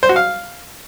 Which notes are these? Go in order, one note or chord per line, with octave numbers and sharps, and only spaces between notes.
C5
F#4
F5